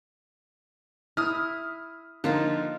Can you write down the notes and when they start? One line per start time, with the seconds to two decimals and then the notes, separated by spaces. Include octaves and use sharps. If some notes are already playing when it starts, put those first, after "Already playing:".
1.17 E4 D#6 F6
2.24 D3 F3 A#3 D#4 F4 A5